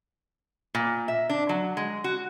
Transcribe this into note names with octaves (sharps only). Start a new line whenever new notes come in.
A#2
E5
D4
F#3
G#3
F#4